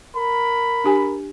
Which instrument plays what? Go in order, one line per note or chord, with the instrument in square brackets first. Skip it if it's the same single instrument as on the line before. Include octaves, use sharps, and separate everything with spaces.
[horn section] A#4 B5
[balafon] D4 G4 G#5